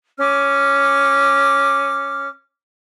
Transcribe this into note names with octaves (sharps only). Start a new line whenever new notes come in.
C#4 D6 F6